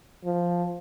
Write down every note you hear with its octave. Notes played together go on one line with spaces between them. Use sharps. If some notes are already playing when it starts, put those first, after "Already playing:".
F3